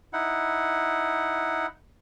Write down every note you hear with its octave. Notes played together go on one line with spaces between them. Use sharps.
D#4 E4 F#5